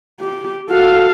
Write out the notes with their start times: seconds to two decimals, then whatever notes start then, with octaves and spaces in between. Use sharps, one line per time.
0.20 G4
0.70 F#4 A4 F5